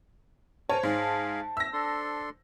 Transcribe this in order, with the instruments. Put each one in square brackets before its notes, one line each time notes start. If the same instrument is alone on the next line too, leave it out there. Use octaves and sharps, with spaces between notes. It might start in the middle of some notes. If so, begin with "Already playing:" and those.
[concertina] A#4 G#5 [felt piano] C5 A5 [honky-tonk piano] C#5
[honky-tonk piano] G#2 [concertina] G#4 F5
[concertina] E5 [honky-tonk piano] E6 A#6
[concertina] D4 A4 C6